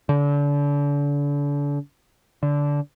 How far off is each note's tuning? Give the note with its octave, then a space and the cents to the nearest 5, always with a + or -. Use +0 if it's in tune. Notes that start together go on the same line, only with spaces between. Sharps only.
D3 -35
D3 -20